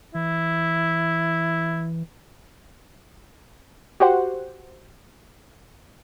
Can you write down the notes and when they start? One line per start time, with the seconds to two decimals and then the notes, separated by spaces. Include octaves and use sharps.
0.15 E3 E4
4.00 F#4 G4 C5 F#5